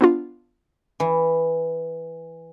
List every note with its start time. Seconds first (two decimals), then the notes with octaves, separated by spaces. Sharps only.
0.01 B3 D4 F4
1.00 E3